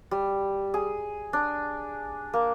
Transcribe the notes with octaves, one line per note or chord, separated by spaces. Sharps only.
G3
G#4
D4
A#3